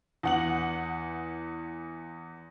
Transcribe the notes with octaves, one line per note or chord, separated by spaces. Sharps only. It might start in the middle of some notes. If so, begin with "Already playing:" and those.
E2 F#5 F#7